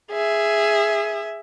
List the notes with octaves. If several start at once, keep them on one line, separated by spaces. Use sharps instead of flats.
G#4 E5